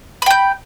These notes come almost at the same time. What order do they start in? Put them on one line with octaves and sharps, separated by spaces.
B5 G5 G6